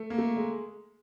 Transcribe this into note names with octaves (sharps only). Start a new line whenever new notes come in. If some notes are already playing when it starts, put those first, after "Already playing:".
Already playing: A3
A#3
A3
G#3